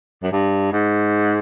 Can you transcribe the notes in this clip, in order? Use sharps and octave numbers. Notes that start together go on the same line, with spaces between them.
F#2
G2
G#2